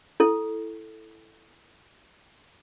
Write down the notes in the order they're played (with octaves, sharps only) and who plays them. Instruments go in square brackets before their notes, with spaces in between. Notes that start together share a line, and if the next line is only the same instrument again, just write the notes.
[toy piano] E4 A4